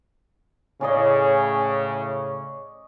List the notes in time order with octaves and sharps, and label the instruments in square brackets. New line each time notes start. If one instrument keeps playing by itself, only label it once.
[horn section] A2 C#3 [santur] C#4 D5 D#5